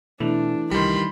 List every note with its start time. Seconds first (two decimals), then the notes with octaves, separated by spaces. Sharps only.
0.20 B2 E3 A3 D4
0.71 C2 D#3 G3 B5 C6